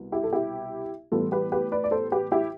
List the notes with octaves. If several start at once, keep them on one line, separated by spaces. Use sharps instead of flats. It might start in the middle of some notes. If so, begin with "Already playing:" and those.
Already playing: C2 B2 B3
E4 G4
A4
E4 G4
A2 E3 G3 B3 F4 A4
G4 B4
G4 B4
B4 D5
D5
A4 C5
G4 B4
E4 G4